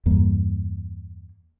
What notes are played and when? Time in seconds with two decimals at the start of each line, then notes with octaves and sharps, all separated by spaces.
0.06 E2 G2 A#3